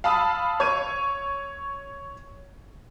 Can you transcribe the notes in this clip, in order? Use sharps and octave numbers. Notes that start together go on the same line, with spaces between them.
F5 A5 B5 D#6 E6
C#5 G#6 D#7